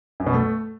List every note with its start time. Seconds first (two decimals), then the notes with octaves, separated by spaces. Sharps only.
0.20 F#2
0.26 B2
0.33 A3